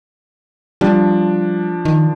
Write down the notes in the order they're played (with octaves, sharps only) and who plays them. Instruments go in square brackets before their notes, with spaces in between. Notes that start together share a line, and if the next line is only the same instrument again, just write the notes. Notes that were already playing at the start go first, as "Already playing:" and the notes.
[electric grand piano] F3 D4 [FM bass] G3
[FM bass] D#3